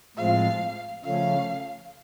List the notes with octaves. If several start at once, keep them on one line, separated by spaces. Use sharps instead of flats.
A2 F3 G#3 C4 F4 F5
C#3 F3 A3 C#4 F5